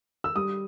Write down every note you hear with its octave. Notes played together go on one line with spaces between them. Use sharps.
E6
G3 D#6